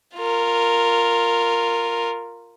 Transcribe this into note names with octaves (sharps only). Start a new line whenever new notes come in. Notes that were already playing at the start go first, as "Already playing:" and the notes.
F4 A#4